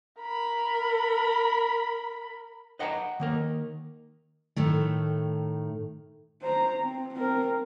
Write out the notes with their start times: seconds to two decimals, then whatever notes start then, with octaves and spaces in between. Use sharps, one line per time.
0.20 A#4 B5
2.79 B4 D#5 F#5 G5 A5 A#5
3.20 D#3 A#3 A#4
4.56 A2 D#3 A3
6.42 C5 A#5
6.80 C4
7.14 C4 A#4